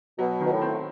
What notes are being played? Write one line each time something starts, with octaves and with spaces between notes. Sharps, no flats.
B2 F#3
B2 D#3
A2
C4